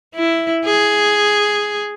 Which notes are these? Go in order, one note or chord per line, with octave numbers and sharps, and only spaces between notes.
E4
G#4